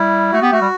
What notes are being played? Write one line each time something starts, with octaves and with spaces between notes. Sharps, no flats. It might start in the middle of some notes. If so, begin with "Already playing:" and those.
Already playing: G3 E4
A3 F#4
B3 G4
A3 F#4
G3